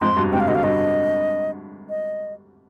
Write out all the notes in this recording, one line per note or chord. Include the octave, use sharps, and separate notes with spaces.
F2 G#2 C6
G2 B2
G#2 C3 G5
F5
B2 D3 D#5
F5
G2 B2 D#5
D#5